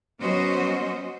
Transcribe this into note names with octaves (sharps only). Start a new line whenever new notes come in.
F#3 B3 C#4 F#4 C5 D#5